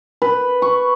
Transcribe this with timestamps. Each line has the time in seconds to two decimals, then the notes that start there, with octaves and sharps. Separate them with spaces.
0.22 B4
0.62 C#6